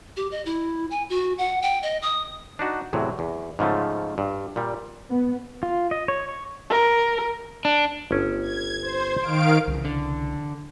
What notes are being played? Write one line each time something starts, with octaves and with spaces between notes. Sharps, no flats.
G4
D#5
E4
G#5
F#4
F#5
G5
D#5
D#6
D4 D#4 F#4
E2 A2 C3 F#3
E2
G#2 C#3 F3 A3
G2
A#2 G3
B3
F4
D#5
C#5
C#6
A#4
D4
G1 C#4
G#6
C5
D#3 F5 D7
C2 C#3 E3
D3